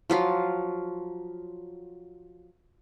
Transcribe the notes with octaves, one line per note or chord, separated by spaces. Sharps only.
F3 F#3 F4